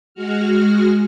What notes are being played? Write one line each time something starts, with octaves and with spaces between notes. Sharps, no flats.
G#3 F#4 F6